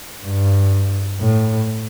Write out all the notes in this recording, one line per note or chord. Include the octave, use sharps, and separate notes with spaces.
G2
A2